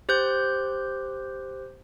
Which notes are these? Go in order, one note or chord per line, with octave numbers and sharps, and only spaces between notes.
G4 C5 F#6 G6